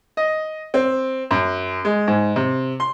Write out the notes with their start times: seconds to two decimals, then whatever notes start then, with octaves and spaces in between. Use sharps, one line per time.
0.17 D#5
0.74 C4
1.31 F#2
1.85 G#3
2.08 G#2
2.36 C3
2.80 C6